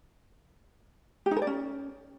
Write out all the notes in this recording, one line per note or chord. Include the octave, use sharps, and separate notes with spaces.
G4
D#4
A#4
D5
C#4